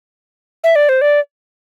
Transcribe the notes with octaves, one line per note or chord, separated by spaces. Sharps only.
E5
D5
C5
D5